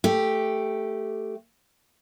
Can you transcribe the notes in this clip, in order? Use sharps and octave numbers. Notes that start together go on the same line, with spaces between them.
A3 G4